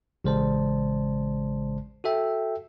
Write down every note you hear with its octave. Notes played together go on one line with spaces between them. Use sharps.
A1 C#3 G#3 C5 D5 A5
F#4 A4 E5 G5